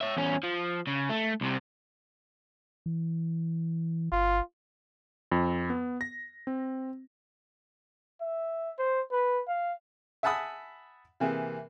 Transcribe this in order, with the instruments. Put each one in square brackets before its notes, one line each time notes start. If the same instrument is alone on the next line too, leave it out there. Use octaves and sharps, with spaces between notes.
[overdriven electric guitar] C#5 E5
E2 C#4
F3
C#3
A3
C2 C3
[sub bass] E3
[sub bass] G1 [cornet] F4
[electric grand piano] F2
B3
A#6
C4
[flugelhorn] E5
C5
B4
F5
[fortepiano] E5 F#5 G#5 A5 B5 D#6
C3 E3 A#3 G#4